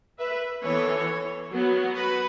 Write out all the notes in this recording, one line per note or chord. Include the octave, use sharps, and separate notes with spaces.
B4 E5
E3 B3 A4 C#5
F#3 B3
F#4 B4